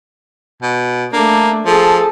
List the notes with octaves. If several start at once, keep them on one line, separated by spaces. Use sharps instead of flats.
B2
A3 A#3 D4
F3 G#4 A4